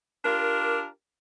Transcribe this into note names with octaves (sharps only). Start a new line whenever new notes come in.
D4 F4 G4 A#4